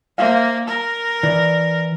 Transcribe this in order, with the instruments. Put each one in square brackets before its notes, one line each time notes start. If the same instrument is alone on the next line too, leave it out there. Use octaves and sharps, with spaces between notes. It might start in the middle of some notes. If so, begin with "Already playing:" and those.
[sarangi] A#3 [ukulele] C5 E5 F5
[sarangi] A#4 [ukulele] A#5
[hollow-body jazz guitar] E3 [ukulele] D5